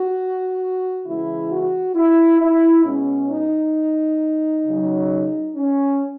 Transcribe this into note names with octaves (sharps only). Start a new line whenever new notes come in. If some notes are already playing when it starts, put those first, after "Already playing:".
Already playing: F#4
C#3 E3 G#3 E4
F#4
E4
E4
B2 G#3 C#4
D#4
C#3 F#3
C#4